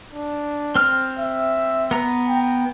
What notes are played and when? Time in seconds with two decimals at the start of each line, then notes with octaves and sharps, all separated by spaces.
0.13 D4
0.75 C4 F6
1.19 E5
1.91 B3 A#5
2.28 G5